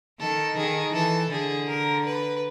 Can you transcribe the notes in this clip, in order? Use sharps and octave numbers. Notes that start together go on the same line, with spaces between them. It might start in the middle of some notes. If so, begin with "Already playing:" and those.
D#3 A4
D#3 G#4
E3 A4
D3 G#4
A#4
B4